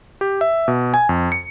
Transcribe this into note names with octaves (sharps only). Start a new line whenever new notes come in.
G4
E5
B2
G#5
F2
C#7